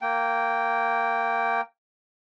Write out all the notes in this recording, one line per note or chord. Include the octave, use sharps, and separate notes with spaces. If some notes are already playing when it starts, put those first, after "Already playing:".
A#3 G5